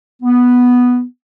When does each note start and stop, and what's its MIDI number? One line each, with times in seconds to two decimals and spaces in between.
0.23 1.03 59